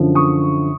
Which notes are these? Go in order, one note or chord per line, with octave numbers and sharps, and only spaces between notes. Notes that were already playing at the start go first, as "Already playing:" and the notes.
Already playing: F#2 D3 F3
C#6 D#6